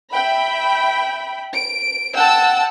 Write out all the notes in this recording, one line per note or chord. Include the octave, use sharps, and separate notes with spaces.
E5 G5 B5
D7
F#5 G5 A5 E6